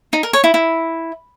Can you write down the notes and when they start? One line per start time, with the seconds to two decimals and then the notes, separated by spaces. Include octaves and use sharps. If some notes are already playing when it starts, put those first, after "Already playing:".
0.13 D#4
0.23 A#4
0.33 C#5
0.44 E4
0.54 E4